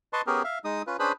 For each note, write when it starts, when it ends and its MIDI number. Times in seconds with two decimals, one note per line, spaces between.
0.13 0.22 71
0.13 0.22 75
0.13 0.22 81
0.13 0.22 84
0.13 0.22 85
0.27 0.43 59
0.27 0.43 61
0.27 0.43 67
0.27 0.43 68
0.27 0.43 70
0.44 0.59 76
0.44 0.59 77
0.65 0.82 56
0.65 0.82 63
0.65 0.82 87
0.87 0.97 61
0.87 0.97 65
0.87 0.97 71
0.99 1.12 61
0.99 1.12 62
0.99 1.12 68
0.99 1.12 71
0.99 1.12 72
0.99 1.12 83